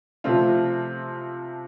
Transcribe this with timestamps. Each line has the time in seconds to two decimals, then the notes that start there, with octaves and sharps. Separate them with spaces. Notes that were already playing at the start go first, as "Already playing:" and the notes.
0.24 C3 F3 A3 C4 F4